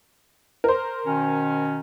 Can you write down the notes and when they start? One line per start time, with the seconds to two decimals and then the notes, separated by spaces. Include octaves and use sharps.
0.64 A#4 C5
1.05 B2 D#3 C#4